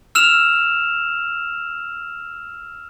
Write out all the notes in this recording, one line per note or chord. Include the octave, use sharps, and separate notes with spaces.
E6 F6 E7 F7